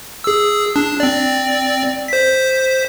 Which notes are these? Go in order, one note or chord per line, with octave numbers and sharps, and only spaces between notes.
G#4 E6
D4
C4 D5
C5 B6